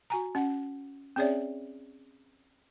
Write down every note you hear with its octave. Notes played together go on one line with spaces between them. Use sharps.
F#4 G#5 A#5
C#4 F#5
C4 C#4 G#4 C#5 D5 E5